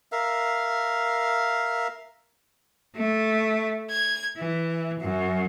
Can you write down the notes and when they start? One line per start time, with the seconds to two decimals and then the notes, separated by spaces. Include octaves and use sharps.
0.12 A#4 E5 F5
2.96 A3
3.90 G#6
4.36 E3
5.00 F#2